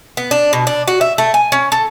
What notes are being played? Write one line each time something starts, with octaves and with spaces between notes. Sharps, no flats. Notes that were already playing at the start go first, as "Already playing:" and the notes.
B3
D4
B2
D4
F#4
E5
A3
G#5
C#4
A4